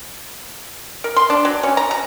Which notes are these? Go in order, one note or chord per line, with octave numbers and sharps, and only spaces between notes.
A#4
C6
D4
F#3
C#4
A#5
A#5